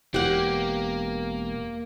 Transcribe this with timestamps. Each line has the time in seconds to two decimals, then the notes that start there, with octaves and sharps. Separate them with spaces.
0.14 E1 A#3 G4 F#5